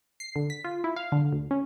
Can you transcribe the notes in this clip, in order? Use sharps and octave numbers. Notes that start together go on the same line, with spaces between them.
C7
D3
B6
F4
E4
F5
D3
D2
C#4